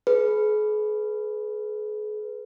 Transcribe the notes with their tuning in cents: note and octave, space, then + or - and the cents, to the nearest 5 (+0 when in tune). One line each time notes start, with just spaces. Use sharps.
G#4 +40 B4 +0